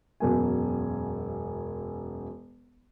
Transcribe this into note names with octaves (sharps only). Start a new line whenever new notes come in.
E1 F#2 G#5